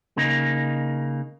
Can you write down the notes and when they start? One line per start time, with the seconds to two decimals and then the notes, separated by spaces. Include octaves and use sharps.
0.17 C#3 A#3 D#4